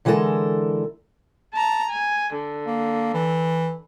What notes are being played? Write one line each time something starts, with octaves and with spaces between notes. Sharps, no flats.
D3 E3 G#3 B3 A4 A#4
A5 A#5
G#5
D3
A#3
E3